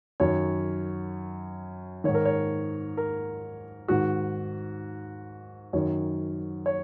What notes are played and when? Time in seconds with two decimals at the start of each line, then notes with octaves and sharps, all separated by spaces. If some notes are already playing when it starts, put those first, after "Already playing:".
0.20 F#2 D#3 C#5
2.04 G#2 D#3 C#5
2.15 A#4
2.25 C#5
2.97 A#4
3.88 G#2 D#3 F#4
5.73 F#2 D#3 C#5
6.66 C#5